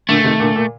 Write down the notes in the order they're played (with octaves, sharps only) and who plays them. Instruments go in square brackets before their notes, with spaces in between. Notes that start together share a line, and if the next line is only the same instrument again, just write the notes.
[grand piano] A#2 D3 [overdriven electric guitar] A3
[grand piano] C3 D#3
A#2 D3
A#2